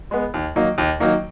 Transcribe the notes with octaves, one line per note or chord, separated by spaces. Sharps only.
G#3 B3
D#2
D#3 F#3 A#3 D#4
D#2
D#3 F#3 A#3 D#4